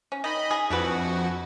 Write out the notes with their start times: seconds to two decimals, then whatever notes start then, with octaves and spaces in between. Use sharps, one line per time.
0.12 C#4
0.24 D#3 D#5 B5
0.51 G#4
0.70 F2 D4 E4 F#4 B4